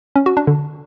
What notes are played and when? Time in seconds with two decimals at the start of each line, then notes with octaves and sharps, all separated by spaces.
0.16 C#4
0.26 F#4
0.37 D4
0.47 D3